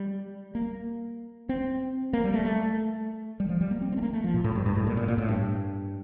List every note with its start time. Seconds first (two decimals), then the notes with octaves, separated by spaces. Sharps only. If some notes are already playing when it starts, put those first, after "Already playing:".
Already playing: G3
0.55 A#3
1.49 C4
2.13 A#3
2.24 G3
2.34 A3
2.45 A3
3.40 G3
3.49 F3
3.61 G3
3.71 A#3
3.81 C4
3.92 C4
3.97 A3
4.02 A#3
4.13 A3
4.24 F3
4.34 A#2
4.44 A2
4.55 G2
4.66 G2
4.76 A2
4.87 A#2
4.97 A#2
5.08 A#2
5.18 A2
5.28 G2